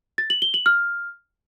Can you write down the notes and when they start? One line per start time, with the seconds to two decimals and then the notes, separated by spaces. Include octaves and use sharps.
0.18 A6
0.30 F#7
0.42 G7
0.54 F#7
0.66 F6